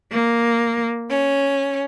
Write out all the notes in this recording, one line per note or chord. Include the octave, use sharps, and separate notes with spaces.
A#3
C#4